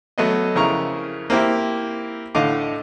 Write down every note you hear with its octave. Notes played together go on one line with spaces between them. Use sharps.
F#3 A3 B3 D#5
F2 C#3 E4 A#4 A#5 C#6
A#3 C4 E4 G4
A2 D3 A3 D#5 F5 D6